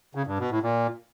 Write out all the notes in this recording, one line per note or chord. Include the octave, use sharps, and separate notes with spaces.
C#3
G2
B2
A2
A#2